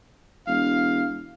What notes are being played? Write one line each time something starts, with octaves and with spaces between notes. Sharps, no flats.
E1 F5